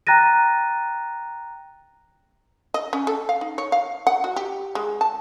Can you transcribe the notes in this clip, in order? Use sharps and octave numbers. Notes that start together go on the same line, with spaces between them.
G5 A#5 F#6 A6 A#6 D#7
D#5
C#4
A4
F5
D#4
C#5
F5
F#5
F#4
G4
G#3
A5